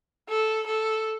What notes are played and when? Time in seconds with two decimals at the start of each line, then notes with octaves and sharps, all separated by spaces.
0.29 A4
0.66 A4